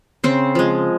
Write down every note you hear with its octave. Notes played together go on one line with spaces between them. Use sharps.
C#3 C4 C5
F3 G#3